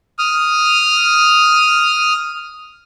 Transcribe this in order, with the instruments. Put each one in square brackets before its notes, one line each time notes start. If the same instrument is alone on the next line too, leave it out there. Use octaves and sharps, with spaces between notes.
[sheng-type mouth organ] D#6 F6